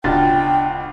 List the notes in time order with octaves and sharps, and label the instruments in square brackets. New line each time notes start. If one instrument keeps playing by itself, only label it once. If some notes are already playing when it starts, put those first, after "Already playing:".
[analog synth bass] D1 [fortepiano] C#2 B2 F4 [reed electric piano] D4 A6 [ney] G5